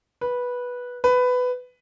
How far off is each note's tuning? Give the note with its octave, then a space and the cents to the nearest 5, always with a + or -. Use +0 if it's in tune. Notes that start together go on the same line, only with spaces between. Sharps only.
B4 -10
B4 +15